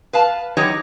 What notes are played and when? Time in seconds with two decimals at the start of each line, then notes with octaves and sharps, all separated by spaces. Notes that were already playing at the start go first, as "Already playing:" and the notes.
0.13 B4 F5 A5
0.57 E2 F#3 D#4 G4 C#5 D#5